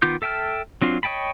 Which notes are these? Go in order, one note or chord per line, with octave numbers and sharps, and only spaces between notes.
D#3 B3 F4 D6 G6
A4 E5 G5 A5 F6
F#3 C4 D4 F4
C#5 D#5 G5 A5 B5